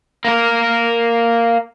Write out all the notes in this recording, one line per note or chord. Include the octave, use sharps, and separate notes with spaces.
A#3 A#4